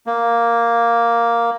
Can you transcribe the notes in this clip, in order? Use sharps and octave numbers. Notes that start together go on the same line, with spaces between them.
A#3